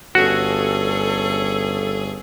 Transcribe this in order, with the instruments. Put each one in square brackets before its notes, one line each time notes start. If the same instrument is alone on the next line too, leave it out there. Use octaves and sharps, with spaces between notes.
[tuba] G1 [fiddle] C#4 G#4 [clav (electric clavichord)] F#4 [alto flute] A4